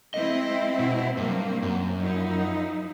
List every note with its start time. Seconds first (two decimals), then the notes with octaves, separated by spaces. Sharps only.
0.14 G#3 C4 E4 D#5
0.79 B2
1.17 G2 F#3 A#3 C4
1.62 F#2
2.01 F3 D#4 E4